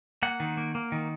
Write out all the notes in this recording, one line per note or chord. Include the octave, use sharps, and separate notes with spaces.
A#3 F#5
D#3
A#3
A#3
D#3